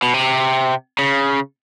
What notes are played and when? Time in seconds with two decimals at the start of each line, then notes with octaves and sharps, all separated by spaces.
0.02 B2
0.14 C3
0.99 C#3